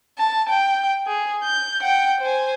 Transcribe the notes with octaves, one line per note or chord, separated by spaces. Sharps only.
A5
G5
G#4
G6
F#5 G5
C5 G#5